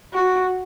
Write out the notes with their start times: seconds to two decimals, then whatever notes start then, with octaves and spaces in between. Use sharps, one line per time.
0.14 F#4